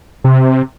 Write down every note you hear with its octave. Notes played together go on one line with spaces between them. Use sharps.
C3